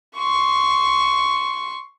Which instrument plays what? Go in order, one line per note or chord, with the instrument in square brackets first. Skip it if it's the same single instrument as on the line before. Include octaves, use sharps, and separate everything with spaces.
[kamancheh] C6 C#6